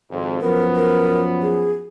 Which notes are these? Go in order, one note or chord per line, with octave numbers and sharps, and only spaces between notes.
G#1 F2
F#2 F3 B3 A#4
A#4
G#4